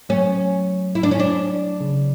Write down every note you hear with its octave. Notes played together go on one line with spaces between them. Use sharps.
F#3 A3 C#4
E4
D4
C#4
D4
C#3